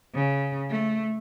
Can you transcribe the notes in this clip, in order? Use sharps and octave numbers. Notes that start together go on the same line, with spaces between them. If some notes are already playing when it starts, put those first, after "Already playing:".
C#3
A3